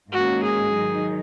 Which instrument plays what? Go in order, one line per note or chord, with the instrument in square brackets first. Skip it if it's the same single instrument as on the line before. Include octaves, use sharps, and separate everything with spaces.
[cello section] G#2 D#3 A#3 C#4 [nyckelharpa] F#4
[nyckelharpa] G#4
[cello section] D#3 F#3 D#4